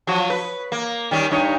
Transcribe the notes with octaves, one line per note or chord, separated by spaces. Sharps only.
F3 F#3 F#4
B4
A#3
D#3 G3 C#4
G2 D#4 C#5